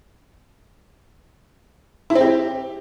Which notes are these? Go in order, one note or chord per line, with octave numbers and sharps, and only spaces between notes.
E4
C4
G4